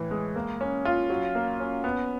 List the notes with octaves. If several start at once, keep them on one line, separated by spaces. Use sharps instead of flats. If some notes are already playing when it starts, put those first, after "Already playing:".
Already playing: A2 E3
G#3
A#3
C#4
F4
F#3
A#3
C#4
B3